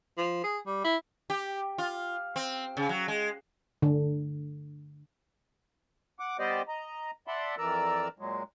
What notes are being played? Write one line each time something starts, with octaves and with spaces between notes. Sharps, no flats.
F3
G#4
G3
E4
G4
F4
C4
C#3
F#3
G#3
D3
F#5 D6
G3 B3 G4 C5 D5 D#5
D#5 A#5
D5 E5 F#5 A5 B5 C6
F2 E3 A#4 D5 A#5 E6
A#2 F#3 G#3